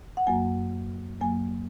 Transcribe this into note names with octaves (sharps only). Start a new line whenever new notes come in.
F#5
F#2 F#3 A#3 G#5
F#2 F#3 A#3 G#5